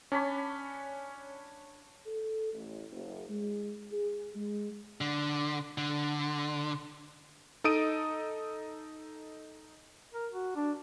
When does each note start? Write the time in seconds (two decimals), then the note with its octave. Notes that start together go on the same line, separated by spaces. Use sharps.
0.12 C#4 D4 C#5 B5
2.06 A4
2.53 A1
2.90 F#1
3.29 G#3
3.91 G#4
4.35 G#3
5.01 D3
5.78 D3
7.64 D#4 A4 D#5 D#6 D7 D#7
10.13 A#4
10.32 F#4
10.56 D4